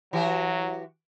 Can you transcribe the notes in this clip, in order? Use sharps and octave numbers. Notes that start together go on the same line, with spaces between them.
E3 F#3 F#4 G4